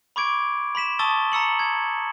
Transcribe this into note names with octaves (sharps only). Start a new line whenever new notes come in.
B5 C#6 D6 G#6 D7
B5 C6 B6 E7
A5 C#6 D#6 E6 A6 G7
A#5 E6 C#7 F#7
G#6